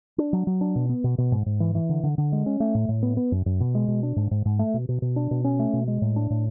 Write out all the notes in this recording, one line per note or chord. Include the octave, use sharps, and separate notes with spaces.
D4
F#3
F#3
D4
B2
B3
B2
B2
G#2
G#2
E3
E3
D3
D3
D3
G#3
C#4
A3
A2
A2
B3
B3
F#2
F#2
B2
G#3
B2
D4
G#2
G#2
G#2
A3
B2
B2
B2
D4
B2
C#4
A3
B2
G#3
A2
D4
A2